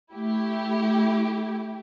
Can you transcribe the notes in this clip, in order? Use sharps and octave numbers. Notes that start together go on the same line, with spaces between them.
A3 E4 G4